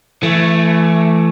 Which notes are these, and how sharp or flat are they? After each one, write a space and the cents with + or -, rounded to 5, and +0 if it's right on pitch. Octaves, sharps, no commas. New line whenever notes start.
E3 +30 A3 +0